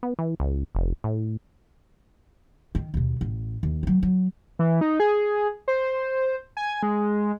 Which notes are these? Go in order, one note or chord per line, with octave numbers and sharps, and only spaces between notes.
B3
E3
C#2
F1
A2
D#3
D#2 B2
A1
D#2
D#3 F#3
F#3
E3
D#4
G#4
C5
G#5
G#3